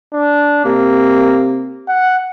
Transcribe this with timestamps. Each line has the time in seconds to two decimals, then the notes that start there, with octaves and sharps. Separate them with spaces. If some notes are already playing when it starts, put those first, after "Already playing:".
0.13 D4
0.65 C3 A#3
1.88 F#5